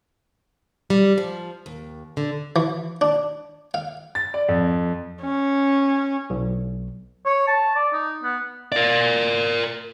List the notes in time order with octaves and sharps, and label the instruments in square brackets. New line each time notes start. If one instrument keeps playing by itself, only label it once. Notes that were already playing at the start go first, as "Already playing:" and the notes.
[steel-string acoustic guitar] G3
F3
D#2
D3
[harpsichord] E3
D4
F5
[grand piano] A6
D5
F2
[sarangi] C#4
[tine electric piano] B1
[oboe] C#5
A5
D5
D#4
B3
[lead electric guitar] A#4 D5